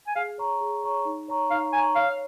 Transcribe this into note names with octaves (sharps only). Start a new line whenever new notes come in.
G#5
G#4 F5
C#5 A#5 C#6
G#4
C#5 A#5 C#6
D#4
C#5 A#5 C#6
D#4 F5
C#5 G#5 A#5 C#6
C#5 F5